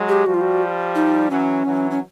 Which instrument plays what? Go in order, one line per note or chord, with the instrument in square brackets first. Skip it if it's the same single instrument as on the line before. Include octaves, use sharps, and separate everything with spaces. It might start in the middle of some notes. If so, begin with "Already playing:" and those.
Already playing: [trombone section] F#3 G#3
[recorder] G4
[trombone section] F3 G3 [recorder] F#4
[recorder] F4
F#4
D#4
[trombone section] E3 F#3 [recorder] C#4
[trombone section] E3 F#3
[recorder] C#4